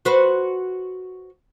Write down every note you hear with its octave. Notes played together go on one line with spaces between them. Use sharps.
F#4 B4 C5